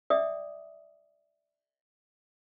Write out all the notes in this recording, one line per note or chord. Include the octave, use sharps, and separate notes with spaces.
D5 E5 G5 D6 D#6